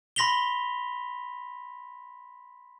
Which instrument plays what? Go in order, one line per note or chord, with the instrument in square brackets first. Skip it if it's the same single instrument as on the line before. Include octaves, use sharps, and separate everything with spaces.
[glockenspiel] B5 C6 A#6 B6 F7 G7